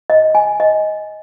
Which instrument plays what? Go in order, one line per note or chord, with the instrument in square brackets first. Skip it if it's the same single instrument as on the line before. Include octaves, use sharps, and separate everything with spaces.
[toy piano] D#5
G#5
D#5